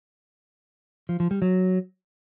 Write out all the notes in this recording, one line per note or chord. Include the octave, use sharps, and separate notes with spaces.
F3
F3
G3
F#3